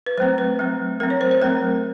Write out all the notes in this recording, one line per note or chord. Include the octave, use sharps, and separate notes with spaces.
B4
F#3 A3 C4 C5
B4
F#3 A3 C4
F#3 A3 C4 A#4
C#5
C5
C5
F#3 A3 C4 A#4